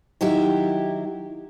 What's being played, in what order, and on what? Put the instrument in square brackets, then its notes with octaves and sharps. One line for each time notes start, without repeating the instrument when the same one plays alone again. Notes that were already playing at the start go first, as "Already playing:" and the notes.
[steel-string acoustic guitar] D#3 F#3 E4 G4